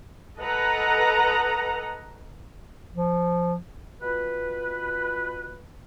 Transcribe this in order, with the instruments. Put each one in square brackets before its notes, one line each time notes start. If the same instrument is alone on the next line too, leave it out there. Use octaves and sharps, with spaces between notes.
[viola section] A4 B4 D#5 F#5 A#5
[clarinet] F3
[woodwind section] B2 F4 B4